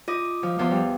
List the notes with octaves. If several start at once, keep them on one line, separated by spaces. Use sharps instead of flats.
F4 D#5 D6
F3
E2 F3 C6
G3